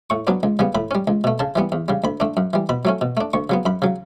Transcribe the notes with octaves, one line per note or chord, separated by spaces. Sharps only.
A2 C#6
F#3 B3 D4
C#2
C#3 G3 B3
A2 B5
G3 C#4
C#2
B2 A3
C#3 A5
E3 G3 B3
E2
C#3 G3
D2 B5
D3 A3 D4
F#2
E3 G3
B2 B5
F#3 A3 C#4
B2
A3 D4
D2 C#6
C#3 F#3 B3
F#2 B5
C#3 F#3